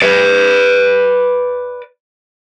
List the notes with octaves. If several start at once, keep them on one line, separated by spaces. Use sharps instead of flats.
B4 D5